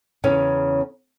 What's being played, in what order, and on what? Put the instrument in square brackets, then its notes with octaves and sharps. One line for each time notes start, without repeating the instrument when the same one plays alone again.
[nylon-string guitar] E2 C#3 C#4